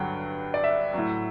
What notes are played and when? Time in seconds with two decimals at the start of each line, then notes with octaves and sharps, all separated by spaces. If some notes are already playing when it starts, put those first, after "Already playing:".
Already playing: G2 D3 F#3 F#5 G5
0.54 D5
0.64 E5
0.94 A2 F#3